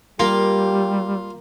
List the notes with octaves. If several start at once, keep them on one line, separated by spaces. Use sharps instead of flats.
G3 A#3 F4 G4